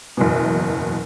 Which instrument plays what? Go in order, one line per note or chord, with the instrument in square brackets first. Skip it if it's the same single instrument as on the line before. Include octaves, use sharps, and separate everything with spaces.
[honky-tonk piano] F#1 E2 B2